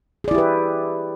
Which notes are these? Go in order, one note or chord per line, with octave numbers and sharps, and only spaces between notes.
E4 G4 G#4 B4 D5